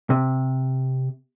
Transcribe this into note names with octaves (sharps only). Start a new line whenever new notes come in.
C3